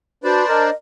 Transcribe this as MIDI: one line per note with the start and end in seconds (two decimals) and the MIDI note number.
0.24 0.70 62
0.24 0.46 66
0.24 0.47 71
0.24 0.70 72
0.24 0.70 74
0.48 0.67 70
0.48 0.75 75